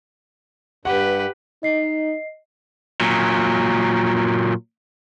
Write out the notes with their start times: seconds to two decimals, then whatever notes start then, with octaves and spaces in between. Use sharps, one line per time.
0.85 G2 G4 B4 F#5
1.63 D#4 D#5 C7
3.01 A#2 F#3